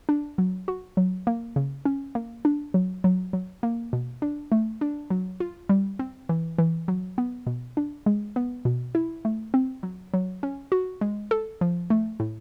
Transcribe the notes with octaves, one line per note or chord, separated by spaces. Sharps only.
D4
F#3
F#4
F#3
A#3
C#3
C#4
A#3
D4
F#3
F#3
F#3
A#3
B2
D4
A3
D4
F#3
F4
G3
C4
E3
E3
F#3
B3
B2
D4
G#3
B3
B2
E4
A3
C4
F#3
F#3
C#4
F#4
G#3
A4
F3
A3
A2